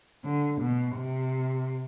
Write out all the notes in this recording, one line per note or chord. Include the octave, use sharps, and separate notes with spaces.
D3
B2
C3